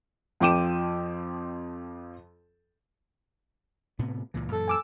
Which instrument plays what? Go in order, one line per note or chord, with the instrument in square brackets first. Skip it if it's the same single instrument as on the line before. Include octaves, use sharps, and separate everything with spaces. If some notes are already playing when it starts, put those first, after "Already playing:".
[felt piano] F2 F3 G5 D6 D#7 E7
[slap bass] A2 C3 B3
C#2 A#2 E3
[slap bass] F#2 A#2 E3 [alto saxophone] A4
[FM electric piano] G#5 D6 E6